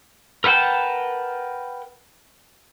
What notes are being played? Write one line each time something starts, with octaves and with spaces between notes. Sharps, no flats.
A#4 B4 F#5 G5 A5